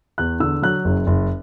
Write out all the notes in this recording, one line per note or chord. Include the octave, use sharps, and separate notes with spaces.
E2 F#6
D3 E6
F#3 F#6
F#1
F#1